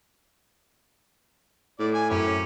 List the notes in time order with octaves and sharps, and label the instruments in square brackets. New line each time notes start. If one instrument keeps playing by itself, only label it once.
[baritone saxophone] A2 [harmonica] D5
[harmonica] G#5
[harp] F#2 C4 B5 [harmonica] C#4 G4